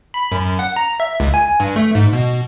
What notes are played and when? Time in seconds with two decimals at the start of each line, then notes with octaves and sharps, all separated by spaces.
0.14 B5
0.32 F#2
0.46 F#2
0.59 F#5
0.76 A#5
1.00 E5
1.20 C#2
1.34 G#5
1.60 G2
1.76 A3
1.95 G#2
2.13 B2